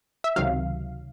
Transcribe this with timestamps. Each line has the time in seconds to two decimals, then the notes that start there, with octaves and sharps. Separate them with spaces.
0.24 E5
0.36 C#2 C3 D#3 F#3 F5